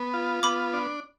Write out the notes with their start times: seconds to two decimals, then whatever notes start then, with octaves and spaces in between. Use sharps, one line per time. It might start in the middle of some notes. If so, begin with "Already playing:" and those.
Already playing: B3
0.14 F4
0.43 B3 B5 D6
0.73 D4